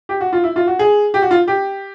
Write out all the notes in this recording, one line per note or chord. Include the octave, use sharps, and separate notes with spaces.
G4
F#4
F4
E4
F4
F#4
G#4
G4
F#4
F4
G4